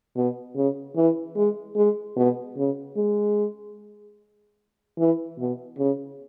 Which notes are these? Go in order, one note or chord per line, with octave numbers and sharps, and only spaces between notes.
B2
C#3
E3
G#3
G#3
B2
C#3
G#3
E3
B2
C#3